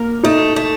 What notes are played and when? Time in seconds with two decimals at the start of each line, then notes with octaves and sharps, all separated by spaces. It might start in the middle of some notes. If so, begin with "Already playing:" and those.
Already playing: A#3 A#4
0.23 A3 D#4
0.56 A3